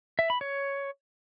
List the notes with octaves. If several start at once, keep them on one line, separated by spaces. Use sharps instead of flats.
E5
B5
C#5